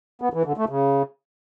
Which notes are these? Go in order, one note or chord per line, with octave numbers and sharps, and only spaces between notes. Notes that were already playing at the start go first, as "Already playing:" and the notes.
B3
E3
D3
A3
C#3